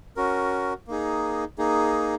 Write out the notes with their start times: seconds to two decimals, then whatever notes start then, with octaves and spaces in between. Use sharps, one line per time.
0.16 C#4 F#4 A#4
0.87 A#3 D#4 G#4
1.58 A#3 D#4 G#4